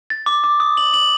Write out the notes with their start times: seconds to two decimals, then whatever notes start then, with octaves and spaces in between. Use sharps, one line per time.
0.10 A6
0.26 D6
0.44 D6
0.60 D#6
0.77 F#7
0.94 F#7